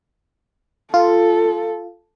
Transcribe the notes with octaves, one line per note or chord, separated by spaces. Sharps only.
F4 A4